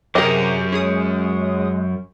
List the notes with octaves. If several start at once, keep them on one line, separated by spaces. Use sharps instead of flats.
F#2 C3 G4 G#4 A#4 D#5
G#3 C#4 G#4 D#6